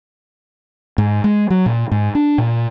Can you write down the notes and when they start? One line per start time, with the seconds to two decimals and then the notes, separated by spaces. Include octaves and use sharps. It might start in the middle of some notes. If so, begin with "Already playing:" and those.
0.98 G#2
1.24 G#3
1.50 F#3
1.66 A#2
1.92 G#2
2.15 D4
2.38 A#2